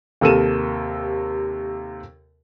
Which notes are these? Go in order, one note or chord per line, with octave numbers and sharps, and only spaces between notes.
D#2 C3 A4 A#4 D#7 E7